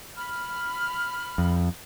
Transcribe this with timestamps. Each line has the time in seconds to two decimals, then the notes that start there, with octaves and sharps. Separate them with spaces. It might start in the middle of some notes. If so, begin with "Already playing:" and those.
0.17 B5 F6
1.38 F2